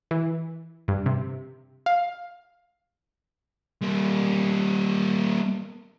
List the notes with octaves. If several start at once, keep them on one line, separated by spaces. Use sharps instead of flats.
E3
G2
C3
F5
G3 A#3